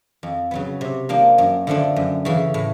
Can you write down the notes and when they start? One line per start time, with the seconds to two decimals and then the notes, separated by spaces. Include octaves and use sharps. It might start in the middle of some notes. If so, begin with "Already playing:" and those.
0.23 F2
0.51 C#3 F#3 B3
0.81 C3
1.09 F3 A#3 D4
1.38 F#2
1.67 D3 F3 A3 D4
1.96 F#2
2.25 C#3 E3
2.54 A2